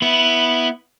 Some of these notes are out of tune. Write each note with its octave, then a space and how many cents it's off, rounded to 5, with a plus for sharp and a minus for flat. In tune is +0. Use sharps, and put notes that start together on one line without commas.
B3 +0 E4 -5